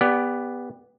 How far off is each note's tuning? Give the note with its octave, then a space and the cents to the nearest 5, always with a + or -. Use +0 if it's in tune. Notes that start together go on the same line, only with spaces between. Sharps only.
B3 +0 G4 +30 D5 +0